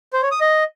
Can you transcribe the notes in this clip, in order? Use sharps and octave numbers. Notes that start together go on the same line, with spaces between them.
C5
C#5
D#6
D#5